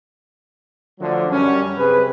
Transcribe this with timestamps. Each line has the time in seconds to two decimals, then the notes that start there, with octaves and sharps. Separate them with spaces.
1.00 D3 F3 F#3 A3 D4
1.31 F#2 G3 C#4
1.77 C3 G#4 B4